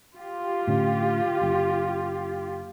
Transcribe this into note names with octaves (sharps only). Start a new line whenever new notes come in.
F4 G4
A2 D3 C#4
F#1